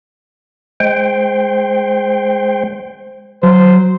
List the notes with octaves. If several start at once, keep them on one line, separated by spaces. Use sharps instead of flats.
G#3 C5 G5
F#3 C5